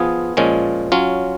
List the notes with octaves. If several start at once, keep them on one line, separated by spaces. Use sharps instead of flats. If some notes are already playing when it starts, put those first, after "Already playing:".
Already playing: F3 B3 F4 G#4
A#2 F3 G#3 C#4
F#3 C#4 F4